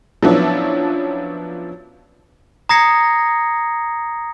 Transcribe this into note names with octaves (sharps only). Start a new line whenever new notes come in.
F3 F#3 B3 C#4 D4 E4
A#5 D#6 G#6 A#6 C7 C#7